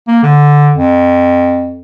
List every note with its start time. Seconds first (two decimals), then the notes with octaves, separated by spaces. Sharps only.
0.08 A#3
0.23 D3
0.74 F2